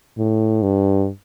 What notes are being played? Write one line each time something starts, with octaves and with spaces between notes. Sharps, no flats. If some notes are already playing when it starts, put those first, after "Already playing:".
A2
G2